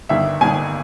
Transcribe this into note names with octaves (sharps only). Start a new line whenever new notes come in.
G1 G2 D#3 E5
G1 G2 D#3 G#5